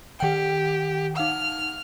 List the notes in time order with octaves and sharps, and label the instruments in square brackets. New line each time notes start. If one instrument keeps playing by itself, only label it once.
[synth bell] D#3 F#5 G5 [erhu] G4
[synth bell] D#4 F5 F#5 [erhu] F6